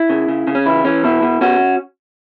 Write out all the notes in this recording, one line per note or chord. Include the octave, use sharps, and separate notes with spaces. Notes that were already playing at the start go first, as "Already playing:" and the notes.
Already playing: E4
C#3
C#3
C#3
C#4
E3 E4
E3 C#4
B2 E4
B2
B2 C#4 F#4